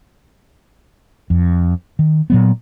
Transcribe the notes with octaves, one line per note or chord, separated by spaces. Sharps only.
F2
D#3
A#2 F#3 B3